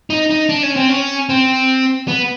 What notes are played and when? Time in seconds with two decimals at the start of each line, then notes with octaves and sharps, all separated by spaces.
0.10 D#4
0.30 D#4
0.49 D4
0.63 C#4
0.76 C4
0.89 C#4
1.29 C4
2.08 B3